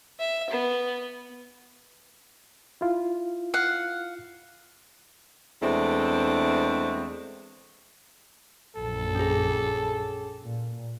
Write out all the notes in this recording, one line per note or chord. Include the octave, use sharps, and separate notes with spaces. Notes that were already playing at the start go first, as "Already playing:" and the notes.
E5
B3
E4 F4
F5 F#5
E2 G#3 A3 C4 D4
A#1 F#2 A4
C#4 G#4
A#2